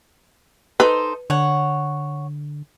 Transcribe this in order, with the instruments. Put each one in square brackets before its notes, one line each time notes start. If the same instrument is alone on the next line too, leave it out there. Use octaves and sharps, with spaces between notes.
[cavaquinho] D#4 A4 C5 [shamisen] B4
[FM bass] D3 [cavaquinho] C#5 F#5